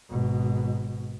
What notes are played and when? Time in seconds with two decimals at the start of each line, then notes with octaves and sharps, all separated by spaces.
0.10 G#1 B2